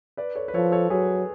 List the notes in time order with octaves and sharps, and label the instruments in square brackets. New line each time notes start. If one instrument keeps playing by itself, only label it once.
[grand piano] B4 D5
A4 C#5
B4
[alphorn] F3 [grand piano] A4 C#5
[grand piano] A4 C#5
[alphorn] F#3 [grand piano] G#4 B4